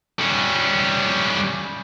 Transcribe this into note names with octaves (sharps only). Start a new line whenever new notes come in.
G3 C#4